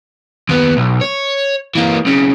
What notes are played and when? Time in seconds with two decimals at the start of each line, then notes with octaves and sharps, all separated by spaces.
0.49 D#2 B3
0.77 B1
1.01 C#5
1.75 E3 A#3
2.05 B1 C#3